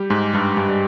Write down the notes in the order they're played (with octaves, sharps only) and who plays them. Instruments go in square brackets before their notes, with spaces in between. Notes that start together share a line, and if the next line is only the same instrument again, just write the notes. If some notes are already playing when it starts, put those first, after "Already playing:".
Already playing: [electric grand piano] G3 G4
G#2 G#3
G2 G3
G2 G3
G3